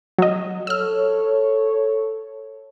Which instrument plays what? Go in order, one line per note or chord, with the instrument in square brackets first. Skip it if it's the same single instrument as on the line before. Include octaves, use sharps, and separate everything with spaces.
[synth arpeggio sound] F#3 D#5
[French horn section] A4 C#5 [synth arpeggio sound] E6 F6